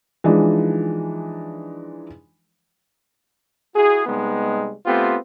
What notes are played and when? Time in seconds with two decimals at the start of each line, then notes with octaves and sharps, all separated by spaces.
0.24 E3 F3 G#3 D4 D#4
3.75 E4 F#4 G#4
4.06 C3 G3 G#3 B3 D#4
4.86 A3 B3 C4 F4 G4